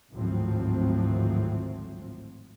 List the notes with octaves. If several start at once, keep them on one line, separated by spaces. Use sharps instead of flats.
G#1 D2 A2 F3 F#3 C4